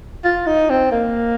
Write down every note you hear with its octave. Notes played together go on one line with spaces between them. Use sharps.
F4
D#4
C4
A#3